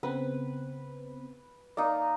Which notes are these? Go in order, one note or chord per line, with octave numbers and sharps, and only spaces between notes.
C#3 B3 C4 B4
A#3 D#4 D5